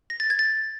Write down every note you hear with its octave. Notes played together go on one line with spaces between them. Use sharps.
A#6
A6
G#6
A6